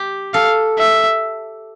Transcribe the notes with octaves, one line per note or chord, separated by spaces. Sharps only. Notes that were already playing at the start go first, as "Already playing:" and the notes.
Already playing: G4
A4 F5
E5